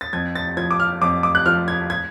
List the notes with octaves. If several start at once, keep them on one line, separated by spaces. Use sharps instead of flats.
A6
F2 G#6
A6
F3 G#6
D6
F6
F2 D6
D6
F#6
F3 F6
G#6
G#6